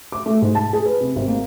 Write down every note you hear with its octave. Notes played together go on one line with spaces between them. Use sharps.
D6
A3
G#2
A5
G#4
B4
C3
G#1
A#3